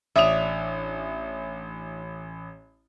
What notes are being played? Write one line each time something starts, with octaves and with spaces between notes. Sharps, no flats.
A1 D4 E5 D#6 F7